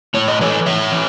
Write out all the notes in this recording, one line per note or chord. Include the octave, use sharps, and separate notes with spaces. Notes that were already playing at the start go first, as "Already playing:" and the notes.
A2 C#5
D#5
E3 A4 C#5
A2 C#5 E5
E3